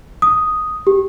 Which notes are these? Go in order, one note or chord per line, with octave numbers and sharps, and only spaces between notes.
D#6
G4